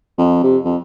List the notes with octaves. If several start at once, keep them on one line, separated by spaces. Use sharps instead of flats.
F2
C3
F2